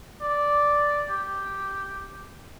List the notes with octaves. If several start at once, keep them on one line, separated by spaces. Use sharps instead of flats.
D5
G4